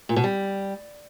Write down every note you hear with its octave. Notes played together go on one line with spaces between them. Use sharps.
A#2
B2
G3